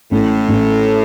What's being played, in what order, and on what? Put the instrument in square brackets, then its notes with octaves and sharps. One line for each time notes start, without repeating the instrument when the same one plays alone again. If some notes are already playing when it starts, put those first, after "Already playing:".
[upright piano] A1 [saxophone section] A2
[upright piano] A1